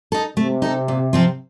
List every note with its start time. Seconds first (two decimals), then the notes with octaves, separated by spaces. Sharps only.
0.12 D#4 A4
0.37 C3 A3
0.62 D#4 A4
0.88 A#2
1.13 F3 C4 F4